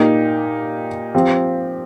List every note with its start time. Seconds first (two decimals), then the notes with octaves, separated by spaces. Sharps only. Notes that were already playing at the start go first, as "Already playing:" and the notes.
Already playing: A#2 A#3 D#4 G4
1.15 F3 C4 G4